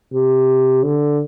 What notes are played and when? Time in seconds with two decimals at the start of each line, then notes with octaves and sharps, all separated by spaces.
0.13 C3
0.83 D3